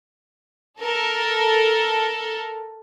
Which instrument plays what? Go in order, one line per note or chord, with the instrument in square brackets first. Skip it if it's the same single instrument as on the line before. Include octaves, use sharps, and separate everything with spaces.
[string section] A4 A#4